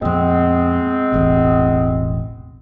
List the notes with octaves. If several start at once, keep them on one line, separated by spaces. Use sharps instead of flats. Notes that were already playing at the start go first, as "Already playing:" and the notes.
F2 A#2 G#3 B3 C4
E1 A1 C3